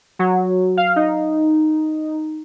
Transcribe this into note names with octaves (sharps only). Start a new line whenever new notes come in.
F#3
F5
D#4